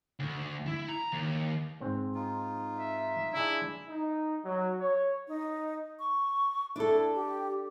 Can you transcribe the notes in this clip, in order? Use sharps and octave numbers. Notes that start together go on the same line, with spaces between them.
D2
E4
A#5
D#2
G#2 C4
D#4 F4
E5
D4 E4 G#4
D#4
F#3
C#5
D#4
C#6
D4 E4 A4
G4